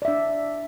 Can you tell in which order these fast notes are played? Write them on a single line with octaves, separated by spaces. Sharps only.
D5 E5 D4